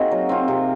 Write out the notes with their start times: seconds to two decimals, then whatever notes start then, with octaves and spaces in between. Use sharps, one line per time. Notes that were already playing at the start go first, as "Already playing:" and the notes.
Already playing: A#3 C4 D#4 F#4 G#4 A#4
0.11 F#3
0.29 C4 F4
0.48 C3